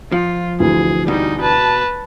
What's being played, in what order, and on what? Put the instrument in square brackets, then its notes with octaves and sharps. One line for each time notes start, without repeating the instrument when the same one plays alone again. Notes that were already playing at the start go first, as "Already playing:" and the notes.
[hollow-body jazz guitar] F3 [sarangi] F4
[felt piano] D2 E3 [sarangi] G#4
[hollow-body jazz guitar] B2 [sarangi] G3 [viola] D#4
[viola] B4 [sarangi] A5